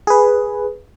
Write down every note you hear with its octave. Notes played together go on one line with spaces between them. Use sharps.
G#4 B4